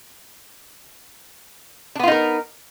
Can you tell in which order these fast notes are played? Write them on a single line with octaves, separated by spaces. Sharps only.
D4 B3 F4 D#4 A#4